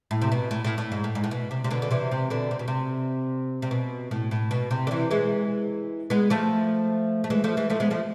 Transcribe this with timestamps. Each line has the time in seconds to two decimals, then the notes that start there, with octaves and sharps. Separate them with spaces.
0.11 A2
0.22 C3
0.32 B2
0.51 A2
0.64 A2
0.78 A2
0.92 G#2
1.04 A2
1.15 G#2
1.24 A2
1.31 B2
1.51 C3
1.64 C3
1.70 B2 D3
1.82 D3
1.91 C3 E3
2.12 C3
2.30 B2 D3
2.51 C3
2.59 B2
2.68 C3
3.62 C3
3.71 B2
4.11 A2
4.31 A2
4.51 B2
4.71 C3
4.87 D3
4.91 C3 E3
5.11 E3 G#3
6.10 G#3 B3
6.30 F3 A3
7.24 A3
7.30 E3 G#3
7.44 F3 A3
7.57 E3 G#3
7.70 F3 A3
7.80 G#3 B3
7.90 F3 A3